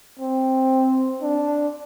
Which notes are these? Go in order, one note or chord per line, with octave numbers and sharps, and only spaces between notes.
C4
D4